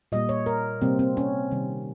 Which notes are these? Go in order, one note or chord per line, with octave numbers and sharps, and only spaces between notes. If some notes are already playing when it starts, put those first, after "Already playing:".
A#2 G3 A#3 D#5
C#5
A#4
C3 G3 A#3 C4
C4
C#4
C3 D#3 G3